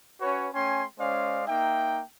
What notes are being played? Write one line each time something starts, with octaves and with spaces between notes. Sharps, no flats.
C#4 F#4 B4 C#5
A3 C#4 G5 G#5 C6
G#3 C#4 C5 D5 F5
A#3 D#4 E5 G5